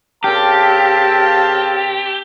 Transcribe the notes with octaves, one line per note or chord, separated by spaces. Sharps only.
C#3 C4 G4 A#4 F5 A5